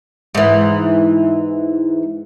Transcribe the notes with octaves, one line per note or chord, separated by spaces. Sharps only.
G#2 E3